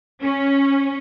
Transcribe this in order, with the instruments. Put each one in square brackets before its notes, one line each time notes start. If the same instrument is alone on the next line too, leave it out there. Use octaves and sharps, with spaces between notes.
[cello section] C#4